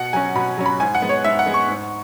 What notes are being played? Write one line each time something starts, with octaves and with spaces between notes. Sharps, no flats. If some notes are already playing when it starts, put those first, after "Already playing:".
Already playing: B2 F#5
F#3 C#4 G#5
B2 B5
F#3 C#4
B5
G#2 G#5
F#5
G#3 B3
C#5
G#2 E5
F#5
G#3 B3
C#6
G#2